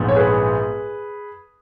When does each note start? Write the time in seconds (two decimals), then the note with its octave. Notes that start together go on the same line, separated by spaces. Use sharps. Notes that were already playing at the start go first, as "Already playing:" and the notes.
Already playing: A#1 G#2 F3 B3
0.08 C#5
0.16 G#4 B4